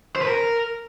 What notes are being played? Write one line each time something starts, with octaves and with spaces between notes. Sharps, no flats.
C5
B4
A#4